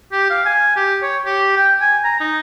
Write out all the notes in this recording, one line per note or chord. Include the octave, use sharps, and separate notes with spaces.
G4
F5
G#5
G4
C#5
G4
G5
G#5
A#5
D#4